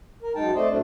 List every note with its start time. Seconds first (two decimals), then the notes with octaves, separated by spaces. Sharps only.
0.23 A#4
0.35 F#2 G#3 D#4 G5 A5
0.55 A3 C4 C5 D5 D#5
0.69 F#2 A2 A3 C4 D4